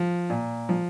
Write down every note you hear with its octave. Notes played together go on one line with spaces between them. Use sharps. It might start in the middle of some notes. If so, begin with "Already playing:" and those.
Already playing: F3
A#2
F3